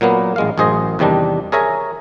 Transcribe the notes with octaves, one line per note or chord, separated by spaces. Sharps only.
A#2 F#3 A#3 B3
A1 G#3 F5
A1 F#2 G#4 C5 D#5
E2 C3 D#3 G3 D4
G#4 A#4 C#5 E5 G#5 A#5